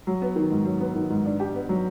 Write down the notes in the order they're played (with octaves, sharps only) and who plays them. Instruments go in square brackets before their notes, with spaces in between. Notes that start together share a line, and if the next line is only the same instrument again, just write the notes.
[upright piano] F#3
B3
D#3
G#2
F#3
B3
D#3
G#2
D4
G4
B3
F#3